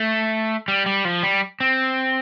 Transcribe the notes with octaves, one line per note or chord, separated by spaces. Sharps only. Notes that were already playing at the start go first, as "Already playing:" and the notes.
Already playing: A3
G3
G3
F3
G3
C4